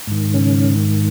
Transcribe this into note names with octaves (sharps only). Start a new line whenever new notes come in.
G#2 D#3
C#3 C#4